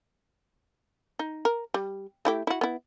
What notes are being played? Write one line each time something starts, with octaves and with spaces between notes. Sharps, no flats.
D#4
A#4
G3
A3 E4 G4
E4 F#4
B3 E4